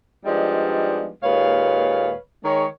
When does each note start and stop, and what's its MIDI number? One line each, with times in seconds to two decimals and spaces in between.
0.25 1.09 53
0.25 1.09 55
0.25 1.09 56
0.25 1.09 59
0.25 1.09 62
0.25 1.09 63
1.23 2.13 39
1.23 2.13 46
1.23 2.13 56
1.23 2.13 71
1.23 2.13 73
1.23 2.13 77
2.44 2.65 51
2.44 2.65 56
2.44 2.65 68
2.44 2.65 73